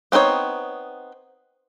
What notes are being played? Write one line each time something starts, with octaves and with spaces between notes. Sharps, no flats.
B3 C4 D#4 C5 C#5